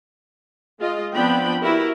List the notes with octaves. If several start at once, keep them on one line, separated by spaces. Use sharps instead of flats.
G#3 F4 D#5
F3 B3 C4 D4 G5 B5
E4 F#4 G4 A#4 B4